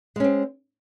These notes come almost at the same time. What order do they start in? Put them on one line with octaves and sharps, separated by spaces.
G#3 C#4 C4